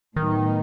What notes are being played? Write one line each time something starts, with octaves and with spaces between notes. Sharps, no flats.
A2 D#3 F#3 B3 D#4